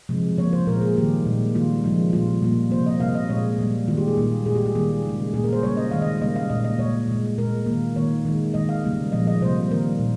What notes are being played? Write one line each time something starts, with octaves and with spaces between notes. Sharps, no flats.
C3 F3 G#3
C#3 F3 A#3 C#5
C5
A#2 G#3 A#4
G#4
D#3 G3 A#3 G4
A#2 G#3
D#3 G3 A#3 F4
C#3 F3 G#3
A#2 G3 A#3 F4
A#2 G3 A#3
C3 F3 A#3 C5
D#5
C3 G3 A#3 F5
D#5
A#2 G#3 C#5
A#2 G3 A#3
D#3 G#3 F4
G4
G#4
A#2 G3 A#3
A#2 G#3 G#4
G4
G4
D#3 G3 A#3 G#4
C#3 G#3
A#2 G3 A#3 G#4
A#4
C5
C#3 G3 A#3 C#5
D#5
D#3 G#3 F5
D#5
C#3 G3 A#3 D#5
F5
A#2 G#3 D#5
D#5
A#2 G#3 C#5
A#2 G#3
A#2 G#3 A#4
D#3 A#3
D#3 A#3 C#5
D#3 G#3
D#3 G#3 D#5
F5
C#3 G3 A#3
A#2 F3 G#3 D#5
D#5
C3 G3 A#3 C5
D#3 G3 A#3 A#4
A#2